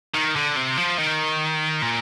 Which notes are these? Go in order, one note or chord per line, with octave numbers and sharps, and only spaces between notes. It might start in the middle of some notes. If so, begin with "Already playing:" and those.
D#3
D3
C3
F3
D#3
A#2